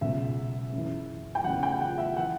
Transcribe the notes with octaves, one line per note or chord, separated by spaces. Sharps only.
C#2 B2 F#3 E5
F#2 E3
G5
E2 C#3 F#3 F#5
G5
F#5
E5
E3 F#5